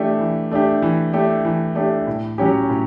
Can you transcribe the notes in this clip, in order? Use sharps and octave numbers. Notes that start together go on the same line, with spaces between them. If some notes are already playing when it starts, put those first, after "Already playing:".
Already playing: E3 A3 D4 G4
E3
A3 D4 G4
E3
A3 D4 G4
E3
A3 D4 G4
A2
F#3 C#4 G4
A2